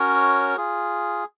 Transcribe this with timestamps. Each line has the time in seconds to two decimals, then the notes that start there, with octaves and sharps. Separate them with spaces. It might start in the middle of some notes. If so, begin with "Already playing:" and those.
Already playing: C#4 F#4 A#4 C#5
0.57 F4 G#4